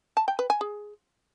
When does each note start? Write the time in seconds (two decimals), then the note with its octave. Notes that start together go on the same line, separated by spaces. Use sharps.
0.17 A5
0.28 G5
0.39 B4
0.50 G#5
0.61 G#4